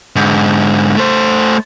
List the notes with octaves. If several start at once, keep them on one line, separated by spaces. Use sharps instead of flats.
G#2 D3
A3 C5